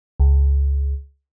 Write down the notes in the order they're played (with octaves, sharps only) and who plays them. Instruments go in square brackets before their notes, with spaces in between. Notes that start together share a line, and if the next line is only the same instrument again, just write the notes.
[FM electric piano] C#2